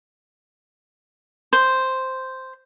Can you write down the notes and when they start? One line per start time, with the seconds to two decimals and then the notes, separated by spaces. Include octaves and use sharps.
1.53 C5